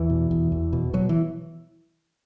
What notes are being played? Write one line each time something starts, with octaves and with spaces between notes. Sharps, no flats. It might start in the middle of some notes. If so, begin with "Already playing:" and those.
Already playing: E2 E3
B2
E2
E2
B2
B2 F#3
E3